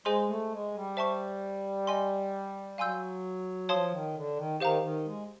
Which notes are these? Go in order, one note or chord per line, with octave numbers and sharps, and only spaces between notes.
G#3 G#4 C5 D#5 G#5 C6
A3
G#3
G3
C5 E5 A5 C#6
D#5 G#5 C6
F#3 F5 G#5 C6 E6 G6
F3 C#5 F5 A5 C6 D#6
D#3
D3
D#3
D#3 G4 C5 F5 A#5
D#3
G#3